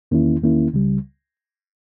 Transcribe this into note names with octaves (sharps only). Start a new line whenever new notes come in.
E2 D#3 A#3 C#4 E4
E2 D#3 A#3 C#4 E4
C#2 C#3 G3